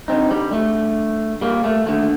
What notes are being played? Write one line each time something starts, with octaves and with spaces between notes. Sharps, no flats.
G2 D3 C4 D#4
G3
A3
G3 A#3
A3
D#2 D3 A3